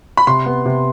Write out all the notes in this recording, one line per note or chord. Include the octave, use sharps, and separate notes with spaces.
B5
C3 C6
B3
C3